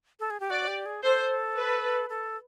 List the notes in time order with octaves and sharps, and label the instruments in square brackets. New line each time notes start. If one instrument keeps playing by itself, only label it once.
[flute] A4
G#4
G4
[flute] F#4 [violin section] D5
[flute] G4
G#4
[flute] A4 [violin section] C5
[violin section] B4
[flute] A4